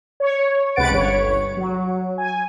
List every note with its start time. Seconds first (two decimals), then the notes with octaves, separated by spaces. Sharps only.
0.20 C#5
0.76 C#2 C3 B4 F#5 A6 D7
0.90 G1 C#5
1.57 F#3
2.18 G#5